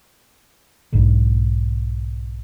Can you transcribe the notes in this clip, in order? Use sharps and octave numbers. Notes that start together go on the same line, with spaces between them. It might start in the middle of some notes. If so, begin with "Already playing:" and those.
B1 G#2 D3